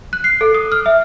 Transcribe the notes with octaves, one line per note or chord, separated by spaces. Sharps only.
F#6
C7
A4
D#6
F6
E5